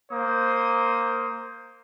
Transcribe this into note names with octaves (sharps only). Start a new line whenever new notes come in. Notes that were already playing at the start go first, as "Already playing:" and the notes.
A#3 C5 D#6